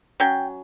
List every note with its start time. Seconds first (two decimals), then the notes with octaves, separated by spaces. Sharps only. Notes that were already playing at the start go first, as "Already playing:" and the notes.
0.20 F#3 C#4 G5